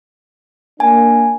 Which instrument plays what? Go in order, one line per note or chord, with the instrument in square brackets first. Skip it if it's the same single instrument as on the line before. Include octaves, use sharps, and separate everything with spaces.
[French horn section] A#3 D4 [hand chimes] G#5